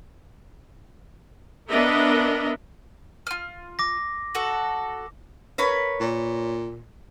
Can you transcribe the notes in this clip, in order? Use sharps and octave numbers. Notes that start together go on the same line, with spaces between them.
B3 D4 A#4 D#5 E5
F4 F6
D6 A#6
F#4 A4
A#4 B4 C#5
A#2